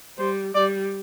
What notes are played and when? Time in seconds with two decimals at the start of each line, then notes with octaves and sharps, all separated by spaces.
0.18 G3 C5
0.55 G3 D5